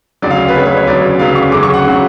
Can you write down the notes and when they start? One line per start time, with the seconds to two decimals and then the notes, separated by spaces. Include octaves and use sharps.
0.22 D2 C#3 F#3 D5
0.31 F5
0.48 B4
0.55 D2 C#3 F#3 C#5
0.65 B4
0.77 C#5
0.87 D2 C#3 F#3 D5
1.19 D2 C#3 F#3 F5
1.36 C#6
1.52 D2 C#3 F#3 D6
1.63 C#6
1.74 F#5
1.86 C#3 F#3